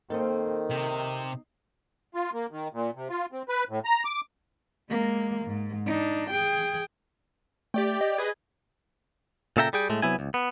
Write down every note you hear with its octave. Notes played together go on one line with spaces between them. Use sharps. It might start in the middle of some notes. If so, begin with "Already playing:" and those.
D#3 A#3 C4 A4 D#5
C3 D#4
F4
A#3
D#3
A#2
C3
F4
C4
B4
A2
A#5
D6
G#3 A#3
G#2
D4 D#4
G#4 G5
A3 G4 D5 G5
D#5
G#4 B4 D#5 G#6
A#2 C#3 A4 E5 G5 A#5
G3 G#4 G5
A2 G#3 A3
C3 F#3 B3 E4 G#5
C#2
B3